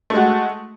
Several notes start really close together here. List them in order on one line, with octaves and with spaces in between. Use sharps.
A3 G#3 F#4